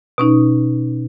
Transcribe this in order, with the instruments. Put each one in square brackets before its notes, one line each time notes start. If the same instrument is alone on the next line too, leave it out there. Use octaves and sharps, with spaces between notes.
[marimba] B2 C#4 D#4